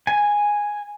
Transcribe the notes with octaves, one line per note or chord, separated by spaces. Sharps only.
G#5